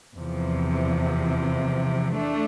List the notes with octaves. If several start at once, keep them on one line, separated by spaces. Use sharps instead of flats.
E2 C3 F3
A3 D4